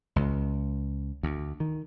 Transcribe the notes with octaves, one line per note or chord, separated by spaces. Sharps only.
C#2
D2
D#3